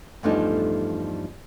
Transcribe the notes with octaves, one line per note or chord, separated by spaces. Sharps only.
E2 G2 F3 A3 D4 D#4